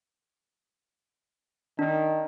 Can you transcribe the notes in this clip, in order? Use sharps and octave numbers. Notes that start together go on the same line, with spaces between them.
D#3 D4